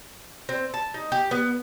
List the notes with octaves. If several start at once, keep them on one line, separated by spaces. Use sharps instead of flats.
C4
A5
D#4
G4
B3